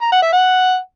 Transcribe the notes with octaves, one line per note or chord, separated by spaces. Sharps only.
A#5
F#5
E5
F#5